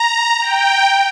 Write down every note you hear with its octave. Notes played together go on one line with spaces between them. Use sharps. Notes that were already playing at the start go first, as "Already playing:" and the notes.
Already playing: A#5
G5